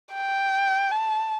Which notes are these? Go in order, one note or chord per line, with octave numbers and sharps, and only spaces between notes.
G5
A5